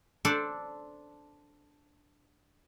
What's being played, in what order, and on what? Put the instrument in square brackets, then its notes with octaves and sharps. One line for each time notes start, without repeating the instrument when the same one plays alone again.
[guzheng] D4 A4 C5 D5